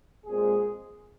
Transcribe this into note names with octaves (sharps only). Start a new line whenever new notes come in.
A#2 G#3 C4 G#4